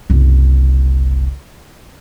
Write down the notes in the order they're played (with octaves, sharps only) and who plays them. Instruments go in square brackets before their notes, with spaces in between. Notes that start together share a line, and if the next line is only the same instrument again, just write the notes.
[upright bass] F#1 C2